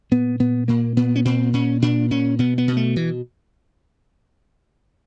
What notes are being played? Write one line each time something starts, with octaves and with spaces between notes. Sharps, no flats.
A#2 B3
A#2 B3
A#2 A#3
A#2 B3
C#4
A#2 C4
A#2 C#4
A#2 D4
A#2 C#4
B2 B3
B3
B2
A3
B2 E3